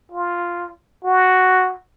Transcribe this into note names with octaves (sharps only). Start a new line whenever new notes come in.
F4
F#4